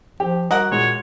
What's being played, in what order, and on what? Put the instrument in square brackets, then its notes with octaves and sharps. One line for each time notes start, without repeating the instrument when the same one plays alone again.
[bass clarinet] F3 [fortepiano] G4
[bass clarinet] G3 [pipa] F#4 A#4 F#5 [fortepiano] D#5
[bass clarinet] A#2 [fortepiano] G#3 [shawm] C#5